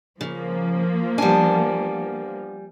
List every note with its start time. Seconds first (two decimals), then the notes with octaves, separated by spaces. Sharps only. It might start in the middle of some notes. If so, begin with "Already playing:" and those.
0.21 C#3 F3 A#3
1.18 G3 B3 D4 G#5